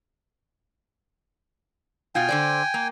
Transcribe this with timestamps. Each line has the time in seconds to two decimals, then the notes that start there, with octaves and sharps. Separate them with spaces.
2.15 B2 F4 G5 G#5
2.29 D3 C5 D5
2.74 A#3